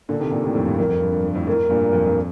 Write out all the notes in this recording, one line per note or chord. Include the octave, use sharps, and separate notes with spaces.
A#2 D3 A4
C3 D#3
A#2 D3
A2 C3
F2 A2
G2
F2 A#4
F2
G2
G2
G2
F2 A2
F2 A2 A#4
G2 A#2
F2
F2